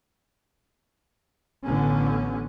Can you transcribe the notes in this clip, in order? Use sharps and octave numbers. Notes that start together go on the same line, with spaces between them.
A1 D3 B3 C#4